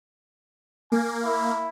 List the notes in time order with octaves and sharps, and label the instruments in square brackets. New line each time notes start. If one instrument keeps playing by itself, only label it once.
[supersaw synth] A#3 [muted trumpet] G#5
[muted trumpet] E4